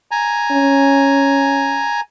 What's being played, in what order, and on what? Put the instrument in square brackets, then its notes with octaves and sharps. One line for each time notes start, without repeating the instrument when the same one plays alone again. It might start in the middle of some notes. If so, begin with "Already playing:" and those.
[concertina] G#5 A#5
[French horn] C#4